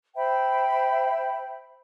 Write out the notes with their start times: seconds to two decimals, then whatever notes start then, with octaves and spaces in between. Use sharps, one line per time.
0.16 C5 E5 G5 B5